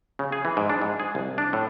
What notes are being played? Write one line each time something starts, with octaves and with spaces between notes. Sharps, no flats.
C#3
G#4
E3
G#2
D4
G#2
G#4
C2
D4
A2